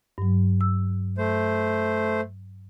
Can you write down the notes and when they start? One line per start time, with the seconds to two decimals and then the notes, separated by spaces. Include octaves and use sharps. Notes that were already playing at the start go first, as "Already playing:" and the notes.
0.18 G2 F#3
0.61 E6
1.18 A3 C5